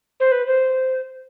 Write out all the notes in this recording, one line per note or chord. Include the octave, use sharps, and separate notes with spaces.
C5
B4
C5